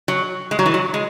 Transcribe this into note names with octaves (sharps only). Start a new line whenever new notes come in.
F#3
G#3
F#3
E3
F#3
G#3